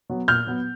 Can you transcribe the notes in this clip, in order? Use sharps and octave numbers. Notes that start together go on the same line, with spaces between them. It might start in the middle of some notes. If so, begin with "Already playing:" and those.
F#3 B3
A#2 F6 G6
F#3 B3